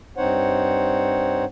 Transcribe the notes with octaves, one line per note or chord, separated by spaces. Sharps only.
G2 C4 D#4 C5 C#5 F#5